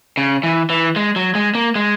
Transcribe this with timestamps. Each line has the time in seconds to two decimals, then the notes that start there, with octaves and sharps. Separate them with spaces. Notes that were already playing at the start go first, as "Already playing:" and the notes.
0.17 C#3
0.43 E3
0.70 E3
0.96 G#3
1.16 F#3
1.35 G#3
1.55 A#3
1.75 G#3